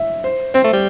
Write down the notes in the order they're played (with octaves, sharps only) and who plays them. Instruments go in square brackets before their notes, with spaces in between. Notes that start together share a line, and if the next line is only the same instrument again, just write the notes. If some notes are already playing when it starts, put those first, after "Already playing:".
Already playing: [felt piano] E5
C5
[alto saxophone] C4 [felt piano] C5
[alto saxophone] A3
G3